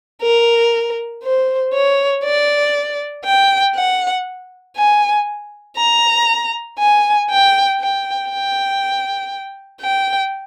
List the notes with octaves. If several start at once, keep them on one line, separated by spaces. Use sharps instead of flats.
A#4
C5
C#5
D5
G5
F#5
G#5
A#5
G#5
G5
G5
G5
G5